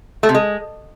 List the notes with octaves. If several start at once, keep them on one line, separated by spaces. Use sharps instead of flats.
A3
C3
G#3